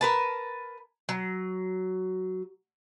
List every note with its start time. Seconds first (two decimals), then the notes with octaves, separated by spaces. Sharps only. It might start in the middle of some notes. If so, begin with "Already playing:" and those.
0.01 A#4 B4 A5
1.09 F#3